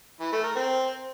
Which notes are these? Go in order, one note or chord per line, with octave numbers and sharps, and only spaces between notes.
E3
A3
A#4
C4